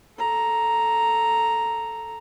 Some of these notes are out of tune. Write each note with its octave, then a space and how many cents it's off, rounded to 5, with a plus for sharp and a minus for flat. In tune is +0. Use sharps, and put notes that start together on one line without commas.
A4 -5 A#5 +0